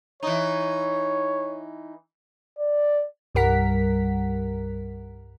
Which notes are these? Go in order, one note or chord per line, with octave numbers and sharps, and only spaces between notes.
E3 D#4 C#5
D5
C2 G2 G3 A#4 F#5 B6